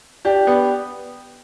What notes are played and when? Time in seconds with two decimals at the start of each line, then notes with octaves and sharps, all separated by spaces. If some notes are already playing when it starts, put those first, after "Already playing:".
0.25 D4 G4
0.47 B3